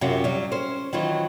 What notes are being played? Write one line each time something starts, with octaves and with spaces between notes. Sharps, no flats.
F#2 C3 C#4 F4 F#4
F#3 G3
C#4 C5
D#3 E3 F#3 F4